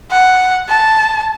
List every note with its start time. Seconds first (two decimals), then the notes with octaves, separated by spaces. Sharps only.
0.11 F#5
0.69 A5